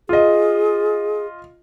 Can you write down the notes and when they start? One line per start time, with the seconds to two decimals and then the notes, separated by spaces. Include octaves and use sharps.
0.09 F4 G#4 D#5